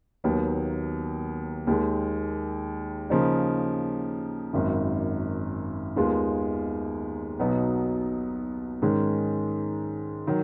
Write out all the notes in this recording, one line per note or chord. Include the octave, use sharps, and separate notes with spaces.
D#2 D#3 F#3 B3
D#2 D#3 G#3
C#3 F3 A#3 D#4
G#1 F#2 D#3
D#2 D#3 G#3 B3 F4
B1 B2 F#3 B3 D#4
G#2 D#3 G#3 C#4
D#3 F#3